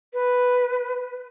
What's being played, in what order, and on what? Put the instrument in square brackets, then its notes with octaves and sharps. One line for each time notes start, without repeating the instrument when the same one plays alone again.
[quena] B4